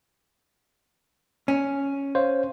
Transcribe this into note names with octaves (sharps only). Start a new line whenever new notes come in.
C#4
C5 C#5 F5